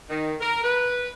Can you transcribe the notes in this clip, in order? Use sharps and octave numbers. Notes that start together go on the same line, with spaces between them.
D#3
A#4
B4